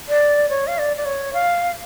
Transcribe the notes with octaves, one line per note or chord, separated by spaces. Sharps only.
D5
C#5
F5
D5
D5
C#5
F5